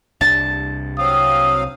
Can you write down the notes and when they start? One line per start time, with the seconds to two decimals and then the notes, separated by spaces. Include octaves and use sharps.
0.21 C2 C3 D4 A5
0.98 F#3 C4 F5 D#6